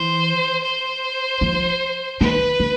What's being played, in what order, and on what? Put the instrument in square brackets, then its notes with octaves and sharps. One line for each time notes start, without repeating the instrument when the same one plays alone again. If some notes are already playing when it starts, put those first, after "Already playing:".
Already playing: [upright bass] E3 [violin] C5
[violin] C5
[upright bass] F3
[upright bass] D#3 [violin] B4
[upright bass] D3